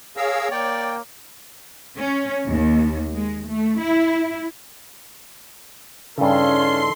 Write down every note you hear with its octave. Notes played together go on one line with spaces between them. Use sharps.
G#4 A#4 C#5 F5 E6
A#3 D5 G5
C#4
D#2
G#3
A3
E4
G2 C#3 C#4 D#4 E4 A4 C6